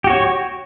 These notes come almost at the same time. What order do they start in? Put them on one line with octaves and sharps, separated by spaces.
G4 F#4 C#5